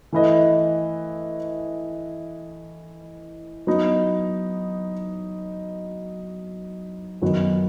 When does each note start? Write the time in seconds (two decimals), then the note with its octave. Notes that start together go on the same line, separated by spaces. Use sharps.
0.13 E3 A3 E4 B4 D#5
3.67 F#3 B3 D#4
7.22 F#2 D#3 F#3 B3 D#4